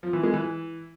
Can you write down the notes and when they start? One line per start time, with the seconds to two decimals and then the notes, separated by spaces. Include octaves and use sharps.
0.03 F3
0.13 E3
0.23 G#3
0.34 E3